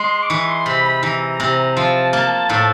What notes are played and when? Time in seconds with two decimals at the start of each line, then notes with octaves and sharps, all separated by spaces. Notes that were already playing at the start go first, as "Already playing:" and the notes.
Already playing: G#3 C6
0.23 D6
0.29 E3 C#6
0.48 C6
0.66 C3 B5
0.85 B5
1.03 E3 A#5
1.40 C3
1.76 F3 A5
2.13 A#3
2.49 A2